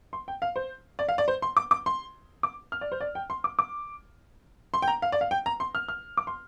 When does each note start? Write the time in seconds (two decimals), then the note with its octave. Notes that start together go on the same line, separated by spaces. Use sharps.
0.13 C6
0.28 G5
0.42 F5
0.56 C5
0.99 D5
1.09 F5
1.18 D5
1.28 C5
1.42 C6
1.57 D6
1.71 D6
1.86 C6
2.43 D6
2.72 F6
2.81 D5
2.92 C5
3.01 D5
3.15 G5
3.30 C6
3.44 D6
3.59 D6
4.74 C6
4.82 G5
4.88 A#5
5.02 F5
5.12 D5
5.21 F5
5.31 G5
5.46 A#5
5.60 C6
5.75 F6
5.88 F6
6.17 D6
6.27 C6